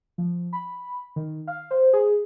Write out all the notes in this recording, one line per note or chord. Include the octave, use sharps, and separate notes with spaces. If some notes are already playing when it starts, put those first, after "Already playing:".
F3
B5
D#3
F5
C5
G#4